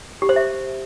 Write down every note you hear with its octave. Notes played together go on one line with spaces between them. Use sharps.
G4
C5
E5